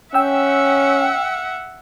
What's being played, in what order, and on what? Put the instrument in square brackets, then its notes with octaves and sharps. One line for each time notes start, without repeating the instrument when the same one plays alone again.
[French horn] C#4 [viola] E5 F#5 [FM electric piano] G5 E6